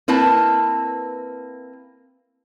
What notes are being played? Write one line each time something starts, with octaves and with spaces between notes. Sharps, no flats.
A#3 C4 E4 B4 A5